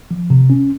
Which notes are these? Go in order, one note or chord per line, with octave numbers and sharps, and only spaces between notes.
F3
C3
C#4